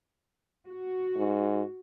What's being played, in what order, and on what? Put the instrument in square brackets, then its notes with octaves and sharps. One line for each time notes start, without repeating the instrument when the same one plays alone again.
[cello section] F#4
[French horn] G#2